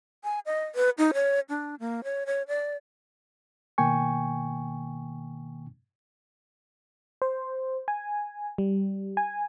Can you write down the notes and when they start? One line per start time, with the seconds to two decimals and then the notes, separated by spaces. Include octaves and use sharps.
0.24 G#5
0.46 D#5
0.75 B4
0.98 D#4
1.14 C#5
1.50 D4
1.80 A#3
2.04 C#5
2.26 C#5
2.48 D5
3.78 B2 D#3 A#3 G5 G#5 C#6
7.22 C5
7.88 G#5
8.58 G3
9.17 G#5